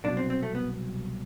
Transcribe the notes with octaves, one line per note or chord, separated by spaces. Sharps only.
C2 B2 F#3 D4
C4
C4
A3
B3